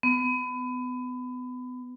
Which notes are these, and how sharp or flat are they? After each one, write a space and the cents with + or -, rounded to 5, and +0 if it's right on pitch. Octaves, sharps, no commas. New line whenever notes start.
B3 +25